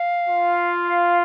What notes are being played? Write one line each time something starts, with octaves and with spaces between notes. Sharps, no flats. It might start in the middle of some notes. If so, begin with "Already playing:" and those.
Already playing: F5
F4